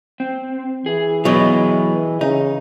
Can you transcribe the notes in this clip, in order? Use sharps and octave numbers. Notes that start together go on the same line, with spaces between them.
C4
E3 G#4
B2 F#3 G#4 B4 D#5
C#3 D#4